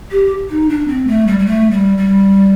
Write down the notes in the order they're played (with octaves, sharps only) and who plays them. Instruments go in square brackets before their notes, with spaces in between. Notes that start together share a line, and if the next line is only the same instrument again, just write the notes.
[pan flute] G4
D#4
D4
C4
A3
G3
G3
A3
G3
G3